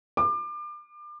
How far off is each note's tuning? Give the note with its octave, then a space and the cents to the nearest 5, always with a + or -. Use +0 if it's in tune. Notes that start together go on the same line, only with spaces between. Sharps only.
D6 +30